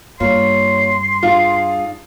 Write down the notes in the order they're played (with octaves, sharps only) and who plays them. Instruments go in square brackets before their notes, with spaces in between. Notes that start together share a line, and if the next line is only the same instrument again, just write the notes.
[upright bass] G2 [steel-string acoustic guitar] A#3 F4 C#5 [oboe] C6
[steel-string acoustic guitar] D4 G#4 F5 [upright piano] F4